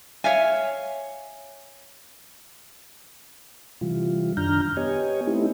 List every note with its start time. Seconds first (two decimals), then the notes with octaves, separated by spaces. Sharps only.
0.24 C#5 E5 F5 G#5
3.81 C3 E3 G3 F4
4.37 F#2 D#3 D4 A#5 F6 G6
4.77 B3 G4 C#5 D#5 G#5
5.27 A3 B3 C4 D#4 E4 G4